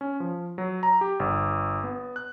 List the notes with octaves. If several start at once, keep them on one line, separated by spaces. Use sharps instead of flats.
C#4
F3
F#3
A#5
G4
G1
B3
F#6